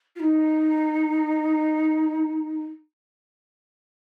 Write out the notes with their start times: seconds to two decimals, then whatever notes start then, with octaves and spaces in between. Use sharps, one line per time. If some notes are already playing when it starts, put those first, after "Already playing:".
0.16 F4
0.20 D#4